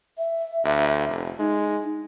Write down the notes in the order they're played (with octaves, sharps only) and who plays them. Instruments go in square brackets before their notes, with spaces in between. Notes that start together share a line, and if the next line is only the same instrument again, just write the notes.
[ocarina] E5
[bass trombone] D2
F1
[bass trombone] G#3 [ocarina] D#4